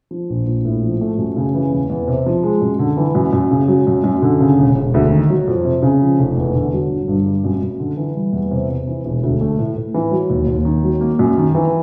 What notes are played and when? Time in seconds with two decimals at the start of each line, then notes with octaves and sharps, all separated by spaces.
0.11 F3
0.30 A#1
0.47 A#1
0.65 A2
0.83 F3
1.01 A3
1.18 F#2
1.36 C#3
1.54 E3
1.73 E2
1.89 E2
2.07 C3
2.26 F3
2.43 G#3
2.61 F#2
2.79 D3
2.97 E3
3.15 F#2
3.33 F#2
3.51 C#3
3.68 F#3
3.87 F#2
4.04 F#2
4.22 D3
4.40 C#3
4.59 E1
4.75 E1
4.94 D2
5.12 D#3
5.30 F#3
5.48 F2
5.65 C3
5.82 C#3
6.01 F3
6.19 F1
6.37 E2
6.55 D3
6.73 F#3
6.90 G1
7.08 G2
7.26 G3
7.44 F#2
7.62 F#2
7.80 D3
7.97 E3
8.15 G3
8.33 E2
8.51 C3
8.69 C3
8.87 E3
9.05 E1
9.23 D2
9.41 A3
9.59 A2
9.76 A2
9.94 E3
10.11 F#3
10.30 D#2
10.47 D#2
10.65 D#3
10.84 F#3
11.01 A#3
11.19 F#2
11.37 D#3
11.55 E3